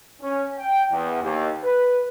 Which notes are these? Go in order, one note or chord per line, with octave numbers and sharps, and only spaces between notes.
C#4
G5
E2
D#2
B4